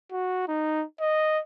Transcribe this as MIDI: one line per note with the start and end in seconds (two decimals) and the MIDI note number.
0.12 0.48 66
0.48 0.84 63
1.01 1.40 75